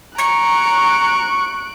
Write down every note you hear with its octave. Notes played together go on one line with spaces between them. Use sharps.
A#5 C#6 F#6 D7